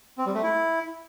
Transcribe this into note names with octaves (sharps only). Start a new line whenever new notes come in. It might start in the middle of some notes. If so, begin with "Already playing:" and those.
C4
G3
A3
E4